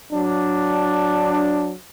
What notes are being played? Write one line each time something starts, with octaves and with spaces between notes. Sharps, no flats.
F#3 D4